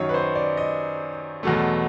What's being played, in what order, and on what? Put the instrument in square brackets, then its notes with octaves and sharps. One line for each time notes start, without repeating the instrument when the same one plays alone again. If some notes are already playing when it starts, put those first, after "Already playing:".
Already playing: [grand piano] F#2 D#3 F#3 C#5 D#5
B4
C5
D5
D#5
E2 B2 F#3 A3